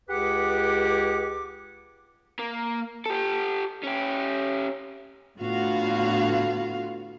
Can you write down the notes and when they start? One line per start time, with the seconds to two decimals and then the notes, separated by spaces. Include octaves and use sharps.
0.09 C#2 G4 G#4 B4 F#5 D6
2.39 A#3
3.06 G4 A4
3.84 C#4 G4
5.38 A2 D3 B3 F4 F#4 F5